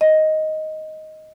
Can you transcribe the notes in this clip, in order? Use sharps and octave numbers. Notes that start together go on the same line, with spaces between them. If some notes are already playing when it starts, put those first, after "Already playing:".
D#5